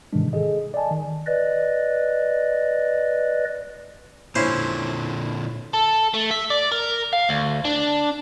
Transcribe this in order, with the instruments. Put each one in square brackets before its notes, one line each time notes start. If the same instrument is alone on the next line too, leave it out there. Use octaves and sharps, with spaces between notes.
[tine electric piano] G#2 C3 D#3 E3 G#3 D4
G#4 A4 D#5
D5 D#5 G#5 A5
D#3
[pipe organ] B4 D5 D#5
[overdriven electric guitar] A#2 D3 [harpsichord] C#4 E4 C5
[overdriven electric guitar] A4
A3
E5
D5
A#4
F5
D2
D4